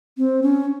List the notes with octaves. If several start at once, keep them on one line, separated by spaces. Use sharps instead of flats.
C4
C#4